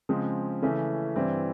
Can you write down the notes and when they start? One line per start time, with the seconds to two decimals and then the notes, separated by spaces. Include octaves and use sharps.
0.09 C#3 F3 G#3 C4
0.62 C#3 E3 A3 C#4
1.16 G2 E3 G3 C4 E4